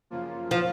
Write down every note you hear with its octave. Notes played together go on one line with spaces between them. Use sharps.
F#2 C#3 F3 A#3 F4
F3